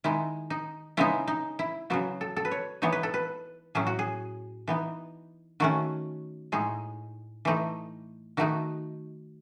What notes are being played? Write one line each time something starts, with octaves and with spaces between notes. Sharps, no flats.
D#3 G#3 D#4 E4
D#4
C#3 G#3 B3 D#4 E4
D#4
E4
C#3 F#3 B3 F#4
A4
A4
B4
C#5
E3 B3 D#4 C#5
B4
A4
B4
A2 F#3 C#4 G#4
F#4
G#4
E3 B3 D#4
D#3 A3 C#4 F#4
A2 G#3 D#4 G#4
E3 A3 D#4
D#3 A3 D#4 F#4